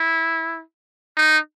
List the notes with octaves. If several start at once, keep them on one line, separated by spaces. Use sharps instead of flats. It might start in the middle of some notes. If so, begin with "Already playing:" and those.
Already playing: E4
D#4